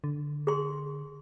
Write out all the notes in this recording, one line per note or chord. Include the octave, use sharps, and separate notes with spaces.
D3
G#4 C6